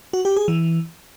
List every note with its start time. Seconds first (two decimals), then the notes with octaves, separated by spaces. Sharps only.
0.13 F#4
0.25 G4
0.36 G#4
0.48 E3